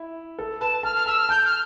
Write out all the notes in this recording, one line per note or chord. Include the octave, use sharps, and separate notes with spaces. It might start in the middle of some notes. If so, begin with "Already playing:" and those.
Already playing: E4
A4
B4 A5
A5 F6
F6
A5 E6
F6
A5 G6
F6